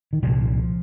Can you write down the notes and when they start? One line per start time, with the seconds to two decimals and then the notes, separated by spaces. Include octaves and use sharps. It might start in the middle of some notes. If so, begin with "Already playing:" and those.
0.13 D#3
0.22 C2 A#2 F3